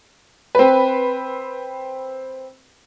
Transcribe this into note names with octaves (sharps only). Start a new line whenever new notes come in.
C4 B4